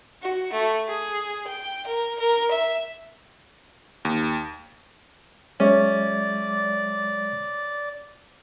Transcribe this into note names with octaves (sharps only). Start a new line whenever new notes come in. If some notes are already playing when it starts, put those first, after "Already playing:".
F#4
A3
G#4
G5
A#4
A#4
E5
D#2
F#3 G#3 C#4 D5 E5